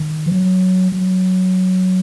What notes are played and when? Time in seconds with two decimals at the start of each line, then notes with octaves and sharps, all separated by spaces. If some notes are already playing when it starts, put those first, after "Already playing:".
Already playing: D#3
0.26 F3
0.32 F#3
0.92 F#3